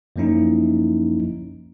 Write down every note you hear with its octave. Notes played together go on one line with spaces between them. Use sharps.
F#2 F3 A#3 C#4 D#4 E4